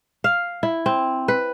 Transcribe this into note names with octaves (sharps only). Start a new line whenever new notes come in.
F5
E4
C4
B4